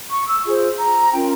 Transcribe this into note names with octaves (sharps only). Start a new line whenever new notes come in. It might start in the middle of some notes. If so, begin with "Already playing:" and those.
C#6
E6
F4 G#4 C5
A#5
C#4 F4 A#4 G5